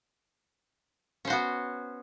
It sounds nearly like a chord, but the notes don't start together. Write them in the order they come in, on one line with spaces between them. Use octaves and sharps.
C#4 C5 F#4 B3